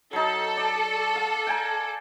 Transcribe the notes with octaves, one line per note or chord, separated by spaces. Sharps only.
F#3 D#4 A4
D5
F5
G5 G#5 A#5